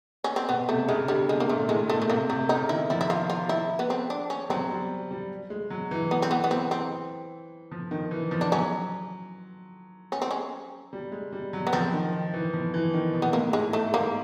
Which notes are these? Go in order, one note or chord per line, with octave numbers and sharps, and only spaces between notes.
C#4
C4
B2 B3
C3 A3
C#3 G#3
D3
C#3 G3
C3 G#3
A#3
A#2 A3
A2 G#3
A#2 A3
A3
C3 A#3
C3 A3
C#3 D#4
D#3 E4
F3 E4
E4
F4
F4
E4
B3
C4
D4
C#4
F#3 C4
G3
G3
G#3
F#3
E3
B3
C4
B3
B3
C4
C4
F3
D#3
E3
F3
D4
F#3 C#4
C#4
C4
C#4
G3
G#3
G3
F#3
B3
F3 C4
D#3
D#3
E3
F3
E3
D#3
B2
B3
A2 A#3
G#2 G#3
A3
G#2 A#3